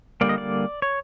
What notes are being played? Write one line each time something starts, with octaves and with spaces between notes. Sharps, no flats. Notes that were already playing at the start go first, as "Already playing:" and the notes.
D3 G3 A#3 D5
D#5
D5
C#5